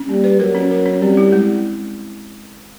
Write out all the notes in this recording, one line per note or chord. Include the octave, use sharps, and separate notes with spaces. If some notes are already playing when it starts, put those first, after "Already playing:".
Already playing: C#4
G3 A#3
B4
F#3 A#4
C#4
A#4
C#4
G3 C4
E4
G#3